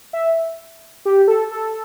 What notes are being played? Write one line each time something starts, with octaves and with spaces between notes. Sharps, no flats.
E5
G4
A4
A4